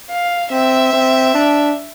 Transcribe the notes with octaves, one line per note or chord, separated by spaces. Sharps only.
F5
C4 E5
C4
D4